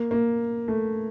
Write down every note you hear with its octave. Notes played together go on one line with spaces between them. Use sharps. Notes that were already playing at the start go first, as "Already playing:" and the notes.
Already playing: A#3
A#3
A3